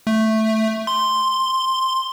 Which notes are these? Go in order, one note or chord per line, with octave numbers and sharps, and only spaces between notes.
A3
C6